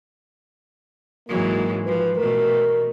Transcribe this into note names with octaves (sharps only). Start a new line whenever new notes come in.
G#2 E3 F#3 A#3
F3 B4
B2 A3 A#4